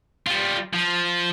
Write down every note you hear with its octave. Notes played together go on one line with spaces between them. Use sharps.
G3 F4
F3